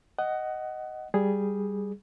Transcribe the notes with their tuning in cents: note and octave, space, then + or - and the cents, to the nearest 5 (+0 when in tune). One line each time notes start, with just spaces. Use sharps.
D#5 +0 F#5 +20
G3 +0 G#4 +0